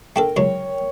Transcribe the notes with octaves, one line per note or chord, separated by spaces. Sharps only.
A3 D4 A4 A#4 G5
C#2 F#2 G#3 C#5